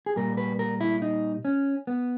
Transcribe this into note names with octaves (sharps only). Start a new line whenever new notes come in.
G#4
A#2 G3 A#4
B4
A#4
E4
D#4
C#4
B3